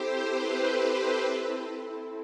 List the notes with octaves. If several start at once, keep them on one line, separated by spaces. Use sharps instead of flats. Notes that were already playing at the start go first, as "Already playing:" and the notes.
Already playing: C4 E4 G4 A4 C5
B4
B4
B4